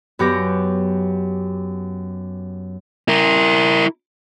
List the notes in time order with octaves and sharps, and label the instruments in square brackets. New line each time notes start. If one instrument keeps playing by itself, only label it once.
[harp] F#2 B3 G4 D6 A#6
[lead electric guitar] E4 A#4